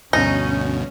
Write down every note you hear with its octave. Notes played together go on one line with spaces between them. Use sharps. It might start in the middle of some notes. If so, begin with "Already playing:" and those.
D2 G2 B2 C#4 D#4